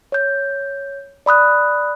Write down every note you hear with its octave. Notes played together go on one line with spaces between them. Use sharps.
C#5 G6
D5 B5 D#6 F#6